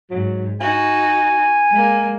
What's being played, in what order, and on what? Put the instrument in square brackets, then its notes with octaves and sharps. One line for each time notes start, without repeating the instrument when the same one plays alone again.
[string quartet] G#2 [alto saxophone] F#3
[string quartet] D#4 F#4 [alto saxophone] G#5
[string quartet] G#3 A#3